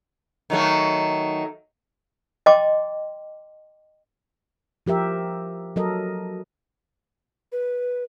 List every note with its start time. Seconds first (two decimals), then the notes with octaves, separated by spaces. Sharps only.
0.50 D#3 F#3 A3
2.46 D#5 G5 A5 C6 D6
4.87 F3 G4 A#4 E5
5.76 F#3 A4 A#4 D#5
7.52 B4